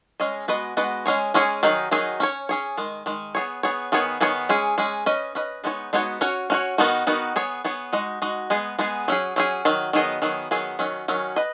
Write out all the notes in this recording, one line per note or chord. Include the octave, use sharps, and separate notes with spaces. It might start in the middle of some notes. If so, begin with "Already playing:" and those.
G#3 C#4 G#4 D#5
G#3 B3 F#4 B4 D#5
G#3 B3 F#4 B4 D#5
G#3 C#4 G#4 C#5
G#3 C#4 G#4 C#5
D#3 F#3 D#4 G#4
D#3 F#3 D#4 G#4
C#4 G#4 C#5
C#4 G#4 C#5
D#3 G#3
D#3 G#3
B3 G#4 C#5
B3 G#4 C#5
D#3 B3 G#4 C#5
D#3 B3 G#4 C#5
G#3 C#4 G#4
G#3 C#4 G#4
C#4 B4 D#5
C#4 B4 D#5
G#3 B3 D#4 F#4 C#5
G#3 B3 D#4 F#4 C#5
C#4 F#4 C#5
C#4 F#4 C#5
D#3 B3 D#4 F#4
D#3 B3 D#4 F#4
B3 G#4 C#5
B3 G#4 C#5
G#3 D#4 F#4 D#5
G#3 D#4 F#4 D#5
G#3 B3 G#4
G#3 B3 G#4
F#3 C#4 G#4
F#3 C#4 G#4
D#3 F#3
D#3 F#3 B3 G#4 D#5
D#3 F#3 B3 G#4
D#3 F#3 B3 G#4
D#3 F#3 C#4
D#3 F#3 C#4
B4 D#5